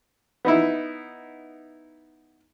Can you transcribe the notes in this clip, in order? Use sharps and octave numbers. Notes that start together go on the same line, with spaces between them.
B3 D#4 E4